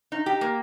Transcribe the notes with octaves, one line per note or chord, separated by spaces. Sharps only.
D#4
G4
A#3